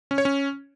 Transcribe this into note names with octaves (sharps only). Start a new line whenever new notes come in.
C#4
C#5
C#4